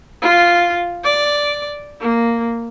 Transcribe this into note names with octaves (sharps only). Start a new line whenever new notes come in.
F4
D5
A#3